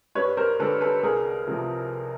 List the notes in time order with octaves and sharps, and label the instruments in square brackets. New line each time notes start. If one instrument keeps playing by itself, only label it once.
[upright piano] G2 B4 C#5
A#4 C5
D3 G3 A4 B4
A4 B4
C2 G#4 A#4
C3 F3